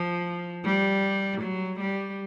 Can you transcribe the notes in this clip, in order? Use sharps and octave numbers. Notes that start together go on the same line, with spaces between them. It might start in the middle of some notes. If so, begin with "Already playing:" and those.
Already playing: F3
G3
F#3
G3